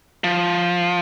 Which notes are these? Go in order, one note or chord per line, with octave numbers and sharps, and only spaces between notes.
F3